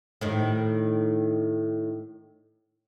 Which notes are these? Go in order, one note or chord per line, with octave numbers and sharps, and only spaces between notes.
A2 D#3